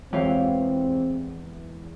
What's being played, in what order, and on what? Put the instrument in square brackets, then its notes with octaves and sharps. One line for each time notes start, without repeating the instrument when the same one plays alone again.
[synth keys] E2 [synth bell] G#3 [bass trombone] C4 [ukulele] G4 C#5 F5